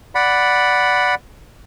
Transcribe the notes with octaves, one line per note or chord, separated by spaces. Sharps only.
D5 F#5 B5